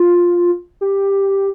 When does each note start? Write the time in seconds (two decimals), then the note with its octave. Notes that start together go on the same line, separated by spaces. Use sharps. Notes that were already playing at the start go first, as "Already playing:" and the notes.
Already playing: F4
0.81 G4